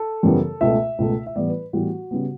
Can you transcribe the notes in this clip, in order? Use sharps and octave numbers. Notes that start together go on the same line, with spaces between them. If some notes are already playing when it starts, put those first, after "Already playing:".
Already playing: A4
F#2 C#3 E3 G3 B3
C#2 B2 A3 E5
C#2 B2 A3
E5
A2 E3 G3 B3 D5
B4
A2 E3 G3 B3 F#4
C#3 G3 B3